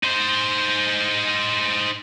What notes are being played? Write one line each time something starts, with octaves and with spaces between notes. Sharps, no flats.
D#4 C5